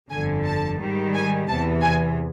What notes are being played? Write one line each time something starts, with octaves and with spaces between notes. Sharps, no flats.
G1 F2 D3 G#5
A5
G#2 D#3 G3
G#5
E2 C3 E3 A5
G#5